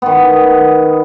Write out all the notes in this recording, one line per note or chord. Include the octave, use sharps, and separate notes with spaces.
D#3 B3